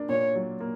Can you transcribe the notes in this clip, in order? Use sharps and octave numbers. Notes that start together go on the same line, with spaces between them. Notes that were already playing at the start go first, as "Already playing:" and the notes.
Already playing: A#3 D4
A#2 C#5
F#3
A#3